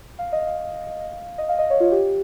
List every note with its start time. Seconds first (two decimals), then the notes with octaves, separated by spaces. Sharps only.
0.19 F5
0.32 D#5
0.47 F5
1.38 D#5
1.49 F5
1.59 D#5
1.70 C#5
1.80 F4
1.92 G4